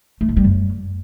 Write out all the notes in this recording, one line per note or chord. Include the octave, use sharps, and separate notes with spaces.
A3
A2
G3
F#2